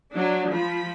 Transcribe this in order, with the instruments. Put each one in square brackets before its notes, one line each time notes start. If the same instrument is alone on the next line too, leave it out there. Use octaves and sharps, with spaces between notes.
[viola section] F#3 D4
F3 B5